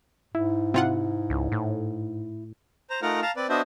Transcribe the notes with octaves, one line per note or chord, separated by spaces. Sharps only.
G#2 E4
C3 E4 F4 F#5
C#2
A2
C5 A#5
A3 D#4 F4 A#4 F#5 A#5
F5 A5 A#5
C4 B4 D5
B3 D4 F#4 C5 D#5 E5